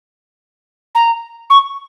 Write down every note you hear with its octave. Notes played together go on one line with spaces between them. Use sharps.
A#5
C#6